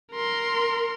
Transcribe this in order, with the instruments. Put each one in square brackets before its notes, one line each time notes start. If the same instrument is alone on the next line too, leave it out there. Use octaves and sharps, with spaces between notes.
[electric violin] A#4 C6